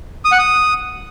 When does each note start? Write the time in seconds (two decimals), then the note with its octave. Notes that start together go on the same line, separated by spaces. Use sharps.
0.25 D#6
0.32 F#5
0.39 D#6